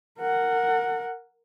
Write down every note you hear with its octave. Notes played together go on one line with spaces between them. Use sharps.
A#4 F#5